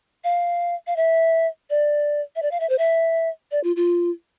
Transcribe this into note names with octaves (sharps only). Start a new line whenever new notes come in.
F5
F5
E5
D5
E5
D5
F5
E5
C5
E5
D5
F4
F4